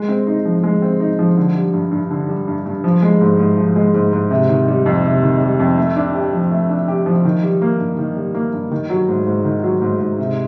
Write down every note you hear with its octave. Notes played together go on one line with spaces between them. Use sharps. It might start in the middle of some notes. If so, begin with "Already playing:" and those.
Already playing: G#3
C4
D#4
F3
G#3
C4
D#4
F3
D3
G3
G2
G2
D3
G3
G2
G2
F3
G#3
G#2
G#2
F3
G#3
G#2
G#2
C3
D#3
G3
F2
C3
D#3
G3
F2
A3
D4
G4
F3
A3
D4
G4
F3
D#3
G3
A#3
G2
D#3
G3
A#3
G2
D#3
F#3
G#2
G#2
D#3
F#3
G#2
G#2
C3